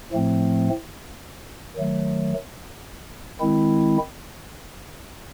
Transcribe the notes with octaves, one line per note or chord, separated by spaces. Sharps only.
A2 F3 A3 C4
D#3 F#3 A3
D#3 G#3 C4 E4